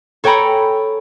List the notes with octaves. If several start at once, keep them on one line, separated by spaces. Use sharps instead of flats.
A4 C#5 G5 G#5 A#5 B5